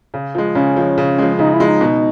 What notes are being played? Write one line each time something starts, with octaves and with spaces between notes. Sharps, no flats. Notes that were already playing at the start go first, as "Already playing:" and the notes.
C#3
F3 G#3
C#3 C#4
F3 G#3
C#3
F3 G#3
C#3 D#4
E4
F3 G#3
D#4
B2